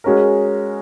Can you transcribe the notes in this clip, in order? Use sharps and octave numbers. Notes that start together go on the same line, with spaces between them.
G#3 C#4 F#4 A#4